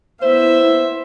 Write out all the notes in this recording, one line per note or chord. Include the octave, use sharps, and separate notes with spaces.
B3 E4 C5 E5